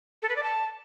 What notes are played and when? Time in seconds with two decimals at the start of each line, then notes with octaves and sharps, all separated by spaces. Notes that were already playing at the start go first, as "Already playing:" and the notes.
0.22 A4
0.29 B4
0.36 D5
0.43 A5